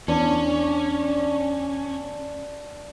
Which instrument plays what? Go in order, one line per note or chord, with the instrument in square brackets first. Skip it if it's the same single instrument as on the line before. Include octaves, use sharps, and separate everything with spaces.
[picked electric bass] E2 [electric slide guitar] C#4 [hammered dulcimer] D4